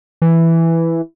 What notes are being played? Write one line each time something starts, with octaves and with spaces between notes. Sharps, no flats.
E3